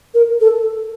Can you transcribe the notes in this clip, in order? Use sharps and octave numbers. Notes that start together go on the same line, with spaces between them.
A#4
A4